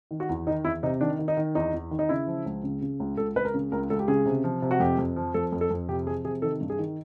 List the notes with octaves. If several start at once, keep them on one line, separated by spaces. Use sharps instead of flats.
D#3
F#4
E2
D#3 D#4
E2 E4
C3 D#4
D#3 D4
D#3
D#4
D#3
E2 D#4
E2
D#3
D#4
C#3 E4
F3
C#2
C#3
C#3
C#2
C#2 A4
C#2 B4
A#4
C#3
C#2 A#4
C#2 A4
G4
C#3 G#4
C3
F3
C3
F#4
F2 G4
F2
F3
F2 A4
F2
A4
F2
C3 G4
F3 G#4
C3 G#4
D#3 A4
G2
G#4
D#3